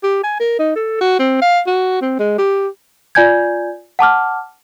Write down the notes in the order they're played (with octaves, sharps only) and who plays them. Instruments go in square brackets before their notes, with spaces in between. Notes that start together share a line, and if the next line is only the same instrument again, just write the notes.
[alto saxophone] G4
G#5
A#4
D#4
A4
F#4
C4
F5
F#4
C4
G#3
G4
[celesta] F4 D5 G#5 G6 G#6
F#5 A5 D6 F6